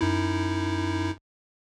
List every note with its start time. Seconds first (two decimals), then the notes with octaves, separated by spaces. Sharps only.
0.01 F#2 D#4 E4